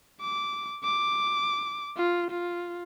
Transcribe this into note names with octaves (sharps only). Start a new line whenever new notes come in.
D6
D6
F4
F4